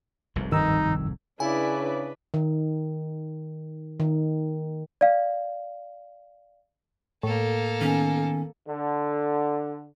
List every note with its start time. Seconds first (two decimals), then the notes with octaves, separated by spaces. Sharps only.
0.36 F1 C2 G#2
0.52 G2 D#3 D#4 E6
1.40 C#3 D4 E4 B4 D5 G#5
2.34 D#3
4.00 D#3
5.01 D5 F5
7.23 A2 A#3 A4
7.81 D#3 B3 C#4
8.67 D3